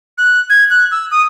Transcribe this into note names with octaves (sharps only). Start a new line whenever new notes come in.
F#6
G#6
F#6
E6
D#6